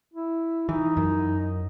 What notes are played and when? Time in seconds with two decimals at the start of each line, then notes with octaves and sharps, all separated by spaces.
0.14 E4
0.69 E3 D#4
0.97 F#2